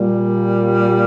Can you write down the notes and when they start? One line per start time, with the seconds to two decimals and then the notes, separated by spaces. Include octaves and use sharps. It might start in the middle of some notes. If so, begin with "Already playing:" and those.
Already playing: A#2 G3